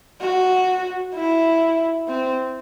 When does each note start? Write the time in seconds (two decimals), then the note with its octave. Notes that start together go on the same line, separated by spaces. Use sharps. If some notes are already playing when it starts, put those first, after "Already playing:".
0.21 F#4
1.14 E4
2.08 C4